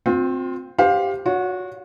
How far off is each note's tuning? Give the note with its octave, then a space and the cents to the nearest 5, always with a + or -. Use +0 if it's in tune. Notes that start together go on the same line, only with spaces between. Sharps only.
C4 +0 F4 +40
G4 +0 C5 +0 F5 +25
F#4 -20 C#5 +30